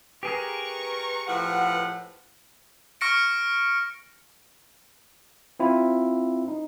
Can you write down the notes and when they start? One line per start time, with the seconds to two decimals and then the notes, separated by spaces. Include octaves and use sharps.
0.23 G4 G#4 A#4 B4 A#5 C#6
1.27 A2 F3 F#5
3.01 C#6 F6 A#6 C#7 D7
5.59 C4 E4 F4
6.48 D#4